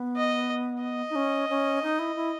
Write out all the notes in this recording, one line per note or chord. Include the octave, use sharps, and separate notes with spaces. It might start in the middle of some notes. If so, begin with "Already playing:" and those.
Already playing: B3
D#5
D#5
D#4
C#4
C#4
D#4
E4
E4